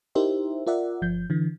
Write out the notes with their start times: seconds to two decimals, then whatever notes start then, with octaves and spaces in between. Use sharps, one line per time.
0.15 D#4 E4 G4 A#4 C5 E5
0.67 F4 A#4 D5 E5 F#5
1.02 G1 F3 G6
1.30 D3 E3